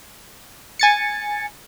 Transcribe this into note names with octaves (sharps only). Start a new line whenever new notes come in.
G#5 A6 C#7